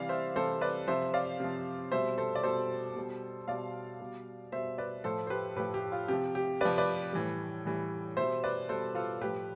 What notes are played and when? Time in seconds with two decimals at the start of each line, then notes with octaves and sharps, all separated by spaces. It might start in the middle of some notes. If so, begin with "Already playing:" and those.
Already playing: C3 E3 G3 D5 F5
0.09 C5 E5
0.36 C3 E3 G3 A4 C5
0.61 B4 D5
0.88 C3 F3 C5 E5
1.14 D5 F5
1.40 C3 F3
1.92 B2 G3 C5 E5
2.18 A4 C5
2.35 D5
2.43 B2 G3 A4 C5
2.96 B2 G3
3.48 B2 G3 D5 F5
4.00 B2 G3
4.52 B2 G3 C5 E5
4.78 B4 D5
5.04 A2 F3 A4 C5
5.27 C5
5.30 G4 B4
5.56 A2 F3 G4 B4
5.74 G4
5.92 F4
6.08 C3 F3 G4
6.35 G4
6.61 C3 F3 B4 D5
6.78 B4 D5
7.13 A2 E3 G3
7.65 A2 E3 G3
8.17 B2 G3 C5 E5
8.44 B4 D5
8.69 B2 G3 A4 C5
8.95 F4 A4
9.21 A2 F3 G4 B4